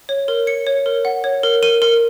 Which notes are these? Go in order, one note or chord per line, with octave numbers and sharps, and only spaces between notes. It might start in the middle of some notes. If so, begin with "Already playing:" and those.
C#5
A#4
C#5 C#7
C#5
A#4
F#5
C#5
A#4
A#4 D#7
A#4